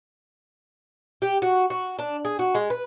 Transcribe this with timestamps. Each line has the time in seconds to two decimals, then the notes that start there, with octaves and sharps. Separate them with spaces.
1.22 G4
1.42 F#4
1.70 F#4
1.99 D4
2.25 G#4
2.39 F#4
2.55 G#3
2.70 B4